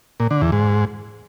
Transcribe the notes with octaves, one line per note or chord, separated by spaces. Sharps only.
A#2
D3
E2
G#2